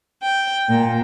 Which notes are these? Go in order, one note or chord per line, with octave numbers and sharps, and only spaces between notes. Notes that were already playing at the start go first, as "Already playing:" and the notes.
G5
A#2